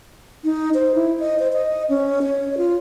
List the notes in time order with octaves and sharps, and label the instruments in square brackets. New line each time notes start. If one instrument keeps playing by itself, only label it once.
[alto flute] D#4
C5
E4
D#5
C5
D#5
C#4
C#5
F4